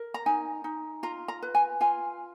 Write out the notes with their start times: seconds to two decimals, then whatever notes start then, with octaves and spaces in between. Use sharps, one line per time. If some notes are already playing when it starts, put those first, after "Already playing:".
Already playing: A#4
0.14 A#5
0.26 D#4 G#5
0.64 D#4
1.03 F4 A#5
1.28 A#5
1.42 B4
1.55 G#5
1.81 F4 G#5